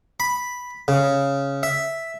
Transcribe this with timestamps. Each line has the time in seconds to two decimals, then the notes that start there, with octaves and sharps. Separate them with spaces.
0.20 B5
0.88 C#3
1.63 E5